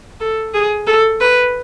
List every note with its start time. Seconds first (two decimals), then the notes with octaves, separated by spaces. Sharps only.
0.20 A4
0.53 G#4
0.87 A4
1.20 B4